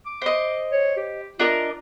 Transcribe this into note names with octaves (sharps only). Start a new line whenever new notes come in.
D6
C5 D#5
C#5
G4
D4 F4 A#4 D#5